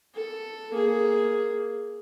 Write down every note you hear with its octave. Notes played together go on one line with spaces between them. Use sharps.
A4
A#3 G#4